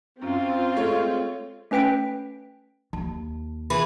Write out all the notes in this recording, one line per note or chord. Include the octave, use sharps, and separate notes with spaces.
F#2 C4 F4
G#3 A3 C#5
A3 C#4 B4 G5 B6 D7
D#2 A5
E3 G#4 B4 B5